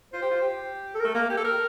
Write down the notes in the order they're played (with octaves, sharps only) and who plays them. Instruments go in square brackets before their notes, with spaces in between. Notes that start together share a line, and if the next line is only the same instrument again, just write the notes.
[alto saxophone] F4 [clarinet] C5
[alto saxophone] G4
F4
G4
[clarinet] A4
A#4
[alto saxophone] A3
[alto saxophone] A#3 [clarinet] A#4
[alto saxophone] G4
A4
A#4